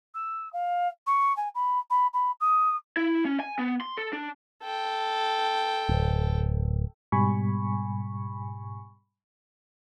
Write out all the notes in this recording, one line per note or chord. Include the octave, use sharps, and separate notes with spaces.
E6
F5
C#6
G#5
B5
B5
B5
D#6
E4
C#4
G#5
B3
C6
A4
D4
A4 G5
D1
G#2 B2 G3 G#5 B5 C#6